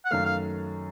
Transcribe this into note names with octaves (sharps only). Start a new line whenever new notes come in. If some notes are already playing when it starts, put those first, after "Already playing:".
F#5
F#2 D#3 A3 F5
F5